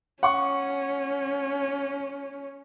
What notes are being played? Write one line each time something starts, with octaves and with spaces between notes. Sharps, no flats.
C#4 F#5 C#6